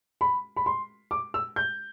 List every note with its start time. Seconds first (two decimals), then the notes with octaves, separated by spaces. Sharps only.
0.21 B5
0.56 B5
0.66 C6
1.11 D6
1.34 E6
1.56 G6